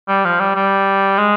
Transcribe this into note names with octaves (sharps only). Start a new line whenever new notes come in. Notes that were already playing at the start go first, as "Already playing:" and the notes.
G3
F3
G3
G3
G#3